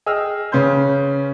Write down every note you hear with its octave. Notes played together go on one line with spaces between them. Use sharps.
G#4 D#5 G5 E6 F6
C#3 C#4 B4 C6 G6